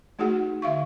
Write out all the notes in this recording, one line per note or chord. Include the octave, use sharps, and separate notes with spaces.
A3 D#4 F#4 G#4 F#5
D3 E5 F5 C#6